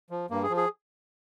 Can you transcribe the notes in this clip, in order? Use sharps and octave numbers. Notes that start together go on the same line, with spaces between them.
F3
G2 A#3
G#4
F3
G#4